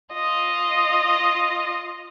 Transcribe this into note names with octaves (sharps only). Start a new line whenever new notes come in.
F4 D#5